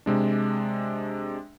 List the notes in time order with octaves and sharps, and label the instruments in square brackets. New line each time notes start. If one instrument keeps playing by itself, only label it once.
[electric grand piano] C3 G#3 D4